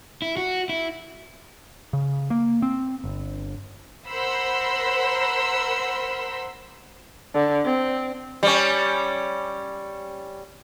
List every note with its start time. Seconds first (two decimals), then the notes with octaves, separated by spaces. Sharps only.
0.22 E4
0.37 F#4
0.69 E4
1.93 C#3
2.30 A#3
2.62 C4
3.04 G1
4.07 A#4 C5 F#5 B5 C6 E6
7.35 D3
7.65 C4
8.43 G3 C#4